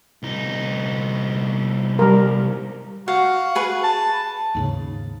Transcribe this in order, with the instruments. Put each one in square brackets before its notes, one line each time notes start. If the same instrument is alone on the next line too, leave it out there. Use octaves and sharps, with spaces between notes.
[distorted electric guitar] C2 D#4
[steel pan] G3 A#4
[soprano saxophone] F#4 [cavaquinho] F5
[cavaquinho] G#4 B4 C#6
[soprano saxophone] A5
[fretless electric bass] D#2 G#2 C#3